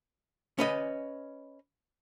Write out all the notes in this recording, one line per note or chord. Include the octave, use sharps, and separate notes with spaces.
C#4 B4 D#5